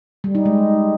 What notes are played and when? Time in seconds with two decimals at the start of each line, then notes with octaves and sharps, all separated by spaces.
0.24 G3
0.35 D#4
0.46 G#3